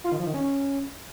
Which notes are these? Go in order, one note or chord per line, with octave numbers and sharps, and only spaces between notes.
F4
D#3
F3
D#3
C#4